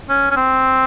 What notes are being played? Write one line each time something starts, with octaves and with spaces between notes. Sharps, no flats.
C#4
C#4
C4